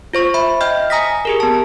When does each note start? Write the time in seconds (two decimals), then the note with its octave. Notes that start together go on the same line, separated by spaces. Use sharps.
0.13 F4 C5 C#6
0.34 E5 B5
0.61 D#5 E5 G5 F6 G6
0.90 G#5 A#5 D#6 A#6 B6
1.25 G4 G#4 A#4
1.40 B3 A5